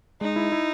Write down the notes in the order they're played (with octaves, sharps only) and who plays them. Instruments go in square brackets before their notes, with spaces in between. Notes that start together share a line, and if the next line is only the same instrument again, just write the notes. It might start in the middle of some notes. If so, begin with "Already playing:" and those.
[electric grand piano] G#3 [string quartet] D#4
[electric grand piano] E4
E4